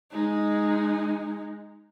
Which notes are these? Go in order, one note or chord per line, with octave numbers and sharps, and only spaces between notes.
G#3 D#4